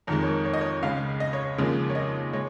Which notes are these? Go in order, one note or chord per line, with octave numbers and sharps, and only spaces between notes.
F2 D#3 G#3 A#4
C#5
A#4
C#5
D#5
C#5
C#2 C#3 G#3 F5
D#5
C#5
D#2 C#3 F3 G#3
C#5
D#5
G#3 C#5